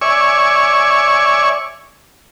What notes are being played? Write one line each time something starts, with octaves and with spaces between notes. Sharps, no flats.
C#5 D5 E5 G#5 C#6